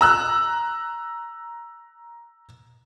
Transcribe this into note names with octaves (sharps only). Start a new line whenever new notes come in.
A#5 E6 F#6